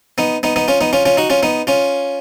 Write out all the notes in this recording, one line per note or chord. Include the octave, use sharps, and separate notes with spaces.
B3 D#4
B3 D#4
B3 D#4
C#4 F4
B3 D#4
C#4 F4
C#4 F4
D#4 F#4
C#4 F4
B3 D#4
C#4 F4